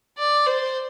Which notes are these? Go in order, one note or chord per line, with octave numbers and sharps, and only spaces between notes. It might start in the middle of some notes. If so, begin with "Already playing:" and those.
D5
C5